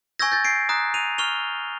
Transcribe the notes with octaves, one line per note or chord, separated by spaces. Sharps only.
G#5 C#6 E6 G6 G#6 A#6
G6 A6
C7 D7
A#5 D#6 F#6
D#7 F7
C#6 F6 F7 G7